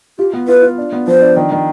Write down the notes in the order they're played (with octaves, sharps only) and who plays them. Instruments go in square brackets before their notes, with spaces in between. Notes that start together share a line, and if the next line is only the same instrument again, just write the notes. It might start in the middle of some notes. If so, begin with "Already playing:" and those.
[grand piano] F4 [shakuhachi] G4
[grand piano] B3
[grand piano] F4 [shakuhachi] B4
[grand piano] F4
D4
B3
[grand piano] F3 [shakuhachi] C5
[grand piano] D4
D#3
D#3